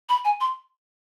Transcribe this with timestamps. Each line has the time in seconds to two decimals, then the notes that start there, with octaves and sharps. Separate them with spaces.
0.09 B5
0.25 G#5
0.41 C6